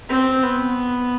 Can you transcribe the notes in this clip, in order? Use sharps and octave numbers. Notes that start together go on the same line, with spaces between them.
C4
B3